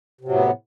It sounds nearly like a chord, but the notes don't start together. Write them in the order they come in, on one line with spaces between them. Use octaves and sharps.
C3 F#3 A2 B3